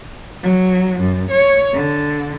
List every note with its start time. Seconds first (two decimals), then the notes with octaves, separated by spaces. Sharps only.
0.43 F#3
1.00 F#2
1.31 C#5
1.73 D3